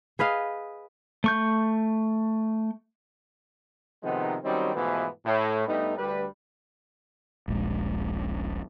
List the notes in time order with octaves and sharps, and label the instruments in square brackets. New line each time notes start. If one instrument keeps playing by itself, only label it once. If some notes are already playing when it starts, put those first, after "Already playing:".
[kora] G#4 B4 D#5 F5
[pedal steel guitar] A3 C#6 G6
[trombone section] C3 D#3 F3 G#3 B3 D#4
D#3 F#3 G3 C4 C#4 D#4
G#2 B2 E3 F3 A3 B3
A2
G2 G3 A3 B3 D#4
D2 G3 B4
[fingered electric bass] D#1 A#1 G#3